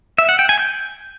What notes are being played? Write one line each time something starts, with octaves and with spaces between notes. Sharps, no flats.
E5
F#5
G5
G#5
G6